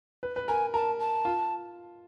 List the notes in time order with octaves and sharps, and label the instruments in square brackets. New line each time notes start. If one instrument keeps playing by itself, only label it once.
[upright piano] B4
B4
[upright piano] A#4 [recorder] G#5
[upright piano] A#4 [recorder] A5
[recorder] A5
[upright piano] F4